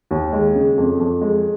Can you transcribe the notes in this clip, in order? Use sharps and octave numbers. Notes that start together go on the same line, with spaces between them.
D#2
G#3
C#3
F2
F2
G#3